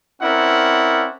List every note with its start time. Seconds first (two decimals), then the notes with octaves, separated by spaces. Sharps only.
0.21 C4 C#4 E4 A#4 D5 F#5